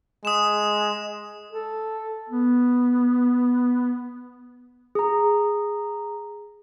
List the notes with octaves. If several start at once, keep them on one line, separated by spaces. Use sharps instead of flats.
G#3 D#6 E7
A4
B3
G#4 A#5